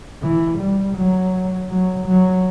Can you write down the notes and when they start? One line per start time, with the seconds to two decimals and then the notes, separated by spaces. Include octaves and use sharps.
0.22 E3
0.58 G3
0.96 F#3
1.70 F#3
2.07 F#3